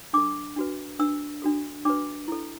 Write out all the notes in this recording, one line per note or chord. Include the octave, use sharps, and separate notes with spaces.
D4 A4 D6
D4 F#4 B4
D4 B4 E6
D4 F#4 A4
D4 F#4 B4 D6
E4 A4